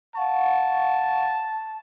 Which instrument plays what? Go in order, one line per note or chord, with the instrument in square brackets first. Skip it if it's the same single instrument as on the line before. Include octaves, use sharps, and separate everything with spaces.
[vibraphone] F5 F#5 C#6 [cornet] A5